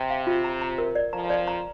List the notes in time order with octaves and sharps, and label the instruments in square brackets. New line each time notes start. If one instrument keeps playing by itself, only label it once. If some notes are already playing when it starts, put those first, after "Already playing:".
Already playing: [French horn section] C3
[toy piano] F5
F4
A#5
A#5
A#4
D5
[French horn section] F2 F3 [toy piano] A#5
[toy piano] D5
A#5